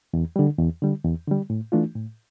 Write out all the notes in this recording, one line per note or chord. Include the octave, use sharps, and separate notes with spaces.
E2
D3 G3
E2
D3 G3
E2
D3 G3
A2
E3 A3 D4 F4
A2